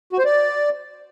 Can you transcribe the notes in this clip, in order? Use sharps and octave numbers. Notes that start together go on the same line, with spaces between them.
F#4
C5
D5